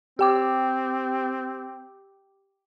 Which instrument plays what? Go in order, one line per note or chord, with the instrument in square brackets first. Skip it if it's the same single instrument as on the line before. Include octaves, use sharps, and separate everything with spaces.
[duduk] C4 [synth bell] G4 G5 D6